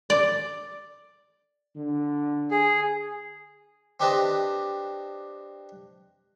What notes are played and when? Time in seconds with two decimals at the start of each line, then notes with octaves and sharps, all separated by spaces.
0.10 D5
1.76 D3
2.51 G#4
4.00 C4 D4 G4 B4 D#5 A5